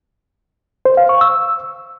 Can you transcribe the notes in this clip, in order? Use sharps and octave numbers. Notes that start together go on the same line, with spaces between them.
C5
F5
C#6
E6